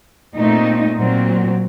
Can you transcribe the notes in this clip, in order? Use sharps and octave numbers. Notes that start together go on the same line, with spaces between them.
A#2 A3 C4 D#4
A#2 F#3 C4